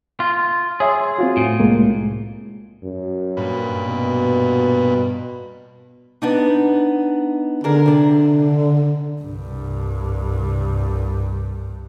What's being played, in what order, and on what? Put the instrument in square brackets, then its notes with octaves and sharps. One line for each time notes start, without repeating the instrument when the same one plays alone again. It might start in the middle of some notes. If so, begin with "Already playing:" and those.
[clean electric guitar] F4
[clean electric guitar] G#4 [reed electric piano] C#5 E5 C6
[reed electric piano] C4 F4 F#4
[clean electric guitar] A2
[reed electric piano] C2 G#3 A#3
[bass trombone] F#2
[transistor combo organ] G2 A#2 B4
[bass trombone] B2
[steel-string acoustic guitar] B3 D4 D#4
[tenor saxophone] D3 [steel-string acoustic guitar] D4 G#4 A#4
[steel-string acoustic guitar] C3 D4
[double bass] C2 G2